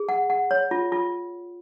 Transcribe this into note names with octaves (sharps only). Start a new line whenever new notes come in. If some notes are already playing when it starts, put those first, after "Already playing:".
Already playing: G#4
F#5
F#5
C#5
F4
F4